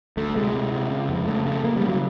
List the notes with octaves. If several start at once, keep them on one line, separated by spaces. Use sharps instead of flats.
D2 A3
C3 G#3
C3
C3
C#3
F2
C#3 A3
C#3 A3
C#3 A#3
G3
C#3
F#3